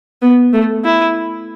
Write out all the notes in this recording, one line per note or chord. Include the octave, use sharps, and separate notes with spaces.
B3
A3
E4